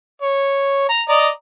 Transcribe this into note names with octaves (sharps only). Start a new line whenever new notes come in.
C#5
A#5
D5 D#5 A#5